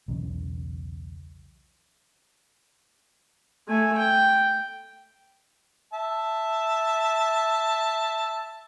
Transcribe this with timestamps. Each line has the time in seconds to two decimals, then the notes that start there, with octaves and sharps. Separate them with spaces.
0.08 B1 E2 C#3
3.69 A3 G#5
3.98 G5
5.93 E5 A5